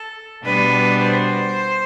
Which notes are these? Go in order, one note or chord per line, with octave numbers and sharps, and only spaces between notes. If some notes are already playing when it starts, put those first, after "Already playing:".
Already playing: A4
B2 G3 B3 D4 B4
C5